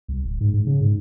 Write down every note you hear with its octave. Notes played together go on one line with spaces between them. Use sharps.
C2
D1
G#2
G#2
C#3
G#2